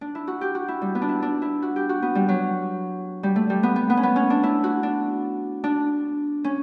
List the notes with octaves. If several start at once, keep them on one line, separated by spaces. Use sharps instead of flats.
D4
E4
F#4
G4
F#4
E4
G3
B3
D4
E4
D4
E4
F#4
G4
F#4
B3
G3
F#3
G3
A3
G3
B3
B3
B3
C#4
B3
C#4
D4
E4
F#4
D4
D4
C#4